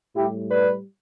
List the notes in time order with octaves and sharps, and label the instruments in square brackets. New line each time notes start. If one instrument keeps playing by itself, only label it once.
[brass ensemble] A2 G3 E4 G4
B4 D5